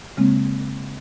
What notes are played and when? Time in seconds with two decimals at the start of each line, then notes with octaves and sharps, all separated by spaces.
0.17 C#3 G#3 A#3 C4